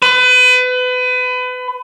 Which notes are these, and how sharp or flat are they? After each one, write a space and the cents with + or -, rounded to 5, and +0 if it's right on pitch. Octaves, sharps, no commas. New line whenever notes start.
B4 +30